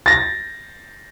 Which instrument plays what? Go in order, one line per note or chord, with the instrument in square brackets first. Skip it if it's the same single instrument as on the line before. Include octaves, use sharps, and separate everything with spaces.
[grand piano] A6 A#6